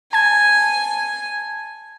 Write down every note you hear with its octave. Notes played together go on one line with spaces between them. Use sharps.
G#5 A5 G#6